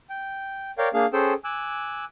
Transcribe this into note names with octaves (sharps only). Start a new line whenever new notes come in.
G5
A#4 C#5 D5 F5 G5
A#3 D4 G#4 F5
C#4 G#4 A4 C5 G5 E6
G#5 D6 E6 F#6